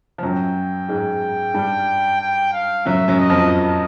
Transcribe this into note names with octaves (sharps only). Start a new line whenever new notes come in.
F3
F#2 F#3 G5
G#2 G#3
G2 G3
G5
F5
F#2 F#3 E5
F#2 F#3
D#5
F2 F3
D#5